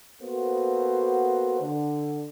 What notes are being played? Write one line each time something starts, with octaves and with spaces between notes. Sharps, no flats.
A#3 B3 F#4 A4 C5
D3